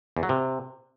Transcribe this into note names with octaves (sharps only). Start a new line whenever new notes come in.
E2
F#3
C3